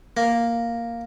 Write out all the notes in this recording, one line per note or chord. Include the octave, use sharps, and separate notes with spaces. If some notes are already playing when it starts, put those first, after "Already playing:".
A#3